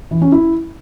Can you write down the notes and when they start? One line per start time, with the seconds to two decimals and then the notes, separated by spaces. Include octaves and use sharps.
0.11 E3
0.22 C#4
0.32 E4